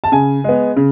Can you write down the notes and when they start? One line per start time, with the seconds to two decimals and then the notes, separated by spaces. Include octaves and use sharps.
0.04 A5
0.12 C#3 G#5
0.44 G#3 B3
0.76 C#3